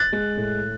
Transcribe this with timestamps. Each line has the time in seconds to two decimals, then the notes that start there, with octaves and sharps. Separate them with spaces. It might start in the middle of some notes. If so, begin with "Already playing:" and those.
Already playing: F#6 A6
0.13 G#3
0.37 A2